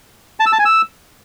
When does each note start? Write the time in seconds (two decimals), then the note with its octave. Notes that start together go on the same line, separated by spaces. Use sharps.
0.40 A5
0.46 E6
0.52 A5
0.59 G#5
0.65 E6